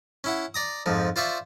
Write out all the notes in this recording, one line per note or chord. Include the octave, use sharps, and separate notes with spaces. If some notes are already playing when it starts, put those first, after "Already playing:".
C#4 E4 F#5
D5 A#5 D#6
F2 G#2 F3
F4 C5 D5 E5 C#6